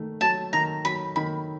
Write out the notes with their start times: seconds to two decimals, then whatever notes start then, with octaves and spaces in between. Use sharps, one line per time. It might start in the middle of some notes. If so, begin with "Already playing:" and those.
Already playing: D#3 A3
0.21 F#3 A5
0.53 D#3 A#5
0.85 F#3 B5
1.16 D#3 B5